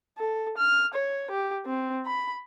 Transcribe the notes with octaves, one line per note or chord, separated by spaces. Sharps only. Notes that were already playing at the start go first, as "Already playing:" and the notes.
A4
F6
C#5
G4
C4
B5